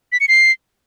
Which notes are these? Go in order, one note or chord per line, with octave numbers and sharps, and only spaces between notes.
B6
C#7
C7